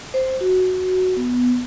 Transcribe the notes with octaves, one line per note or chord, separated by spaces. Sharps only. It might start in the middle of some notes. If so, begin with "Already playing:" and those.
C5
F#4
B3